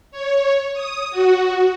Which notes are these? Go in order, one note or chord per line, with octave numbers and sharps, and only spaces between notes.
C#5
D#6
F#4